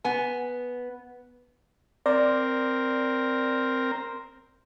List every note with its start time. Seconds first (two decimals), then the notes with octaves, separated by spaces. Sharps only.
0.05 B3 G#5
2.06 C4 A#4 D5